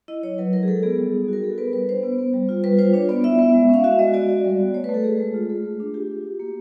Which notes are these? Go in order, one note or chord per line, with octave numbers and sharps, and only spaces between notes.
E4 D#5
F#3 C#5
F#3 B4
G#3 A#4
G#4
G#3 A4
B3 G#4
G3
D#4
F#4 A#4
B3 A4
B3 B4
G3 B4
D4 C5
B3
B3
G3
F4
G3 B4
F4 C5
D4 C#5
B3 D5
E4 E5
B3
G#3
C#4 F5
F#4 E5
G#3 D#5
F#4 D5
F#4
G3
B3
A3 C#5
B4
A3 A4
G#3 G#4
G#3
F4
A3
A3
D4
F4 G4
F4
F#4
A#3